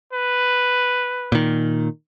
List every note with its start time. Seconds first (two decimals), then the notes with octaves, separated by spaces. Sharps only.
0.13 B4
1.32 A#2 D#3